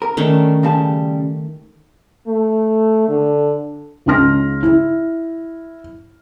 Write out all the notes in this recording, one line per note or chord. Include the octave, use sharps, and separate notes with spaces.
A#4
D#3 A3 C#4 D4
C#3 G3 A5
A3
D3
C#2 C#3 D#4 C6 F6 A#6
E4